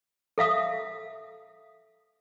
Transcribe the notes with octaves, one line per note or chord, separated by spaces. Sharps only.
A4 E5 F5 D#6